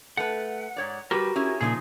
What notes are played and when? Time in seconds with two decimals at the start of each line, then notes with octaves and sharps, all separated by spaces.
0.17 A3 B4 F#5
0.76 G#2 C#5 D5
1.11 G3 F#4 G4 A#4 B4
1.36 C#4 E4 G#4
1.61 A#2 C#3 F3 D#4 G#4